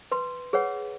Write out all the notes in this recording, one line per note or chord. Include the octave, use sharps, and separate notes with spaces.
B4 C6
G#4 B4 C#5 F#5